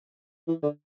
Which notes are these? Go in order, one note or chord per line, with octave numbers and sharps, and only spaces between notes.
E3
D3